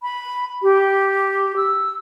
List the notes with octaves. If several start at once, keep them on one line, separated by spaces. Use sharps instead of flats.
B5
G4
E6